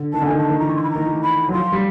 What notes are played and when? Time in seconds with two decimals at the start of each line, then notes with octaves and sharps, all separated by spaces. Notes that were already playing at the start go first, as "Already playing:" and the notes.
Already playing: D3
0.13 D#3 A5
0.22 D3
0.26 D#3 G#5
0.37 A5
0.50 D#3
0.59 E3 A#5
0.69 C#6
0.76 C6
0.83 B5
0.91 D#3 A#5
1.06 E3
1.22 B5
1.49 F#3
1.52 F3 C6
1.72 G3